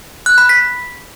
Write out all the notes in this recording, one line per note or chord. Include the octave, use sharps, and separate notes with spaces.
F#6
B5
B6